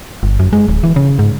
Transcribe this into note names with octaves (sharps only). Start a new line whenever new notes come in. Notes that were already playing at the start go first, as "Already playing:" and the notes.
G1
F#2
G#3
D1
E3
C#3
G#2